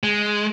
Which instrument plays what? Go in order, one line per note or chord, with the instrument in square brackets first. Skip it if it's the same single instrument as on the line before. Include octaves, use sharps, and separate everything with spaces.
[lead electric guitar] G#3